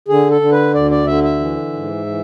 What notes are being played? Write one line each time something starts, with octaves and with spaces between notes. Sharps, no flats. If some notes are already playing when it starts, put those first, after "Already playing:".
D3 G#4
A4
D3
B4
D2 D5
D5
D3 E5
E5
E3
G#2
E3